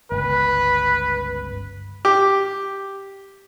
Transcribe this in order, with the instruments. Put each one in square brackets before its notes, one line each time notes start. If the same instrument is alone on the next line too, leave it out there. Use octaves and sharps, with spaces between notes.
[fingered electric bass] G1 C#2 [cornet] B4
[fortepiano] G4